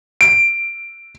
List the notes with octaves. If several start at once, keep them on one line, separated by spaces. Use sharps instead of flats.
D7